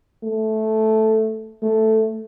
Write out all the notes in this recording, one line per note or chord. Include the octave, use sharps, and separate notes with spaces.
A3
A3